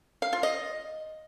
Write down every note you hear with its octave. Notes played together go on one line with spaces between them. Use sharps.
F5
F4
D#5